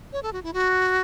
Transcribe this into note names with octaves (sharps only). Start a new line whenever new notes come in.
C#5
A4
F#4
E4
F#4